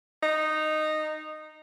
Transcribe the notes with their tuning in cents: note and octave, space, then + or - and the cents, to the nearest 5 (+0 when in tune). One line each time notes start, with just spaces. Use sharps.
D#4 -10